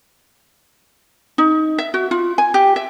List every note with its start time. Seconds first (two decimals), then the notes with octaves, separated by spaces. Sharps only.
1.38 D#4
1.78 E5
1.94 F#4
2.11 F4
2.38 G#5
2.54 G4
2.76 E5